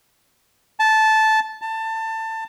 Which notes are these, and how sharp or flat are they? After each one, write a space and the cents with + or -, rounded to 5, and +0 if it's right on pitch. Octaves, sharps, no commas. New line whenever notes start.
A5 -10
A5 +20